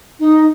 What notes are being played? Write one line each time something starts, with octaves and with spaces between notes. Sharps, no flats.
D#4